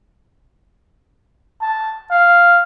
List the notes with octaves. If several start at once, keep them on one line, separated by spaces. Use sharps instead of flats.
A5
F5